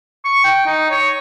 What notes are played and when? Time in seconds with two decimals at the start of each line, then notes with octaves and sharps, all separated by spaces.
0.25 C#6
0.44 G5
0.66 D#4
0.90 C#5